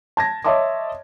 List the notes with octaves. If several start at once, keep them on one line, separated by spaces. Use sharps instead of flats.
A5 G#6 A#6
C#5 D#5 E5 A5 C6 D6